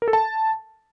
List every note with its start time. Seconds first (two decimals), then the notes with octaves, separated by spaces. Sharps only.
0.02 A#4
0.08 A4
0.13 A5